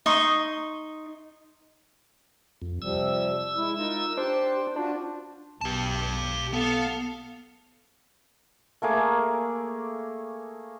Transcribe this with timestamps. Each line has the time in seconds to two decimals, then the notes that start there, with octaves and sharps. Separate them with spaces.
0.06 D#4 C6 C#6 D#6
2.62 F2
2.82 C3 F3 G3 E6
3.56 G#3 E4
3.77 D#4 F4 A#4
4.17 D4 G4 C5 A5
4.76 D4 F4 F#4
5.61 B1 G4 A5
6.53 B3 A4 F5
8.82 A3 A#3 G#4 D6